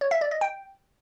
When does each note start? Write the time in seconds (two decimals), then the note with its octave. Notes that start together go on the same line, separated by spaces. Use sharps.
0.01 C#5
0.11 E5
0.21 D5
0.31 D#5
0.41 G5